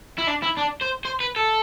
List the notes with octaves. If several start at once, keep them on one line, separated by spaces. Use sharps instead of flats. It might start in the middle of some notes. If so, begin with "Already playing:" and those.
E4
D4
E4
D4
C5
C5
B4
A4